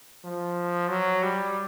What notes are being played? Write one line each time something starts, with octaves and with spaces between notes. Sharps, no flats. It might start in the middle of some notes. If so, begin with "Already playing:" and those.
F3
F#3
G3